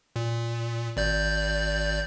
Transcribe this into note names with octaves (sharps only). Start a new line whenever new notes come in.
A#2
G#1 D5 G6